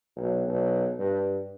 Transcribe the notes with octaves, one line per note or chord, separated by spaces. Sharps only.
B1
B1
G2